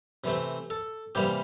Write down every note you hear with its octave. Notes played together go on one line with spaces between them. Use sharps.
C3 E3 A3 C4
A4
C3 E3 G3 A#3 G4